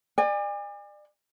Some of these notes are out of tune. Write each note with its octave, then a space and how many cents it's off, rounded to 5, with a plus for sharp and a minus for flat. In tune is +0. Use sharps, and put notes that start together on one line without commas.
D5 +35 G#5 -35